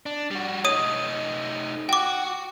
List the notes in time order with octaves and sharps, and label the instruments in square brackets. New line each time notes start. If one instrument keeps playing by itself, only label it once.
[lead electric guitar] D4
G3 F#4
[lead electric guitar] A3 D#4 [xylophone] C#5 D#6 D#7
[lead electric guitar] F#4 [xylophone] G5 D6